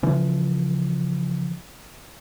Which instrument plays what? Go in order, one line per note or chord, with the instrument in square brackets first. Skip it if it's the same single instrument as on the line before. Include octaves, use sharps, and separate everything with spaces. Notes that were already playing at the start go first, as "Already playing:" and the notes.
[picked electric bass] C#3 E3 F3